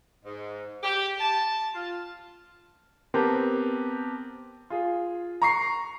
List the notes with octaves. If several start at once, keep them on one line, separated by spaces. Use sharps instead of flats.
G#2
G4
A5
F4
B3 C4 G4 A#4 A5
F4 G#4
A#5 C#6 C7